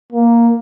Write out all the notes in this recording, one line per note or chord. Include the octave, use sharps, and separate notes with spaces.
A#3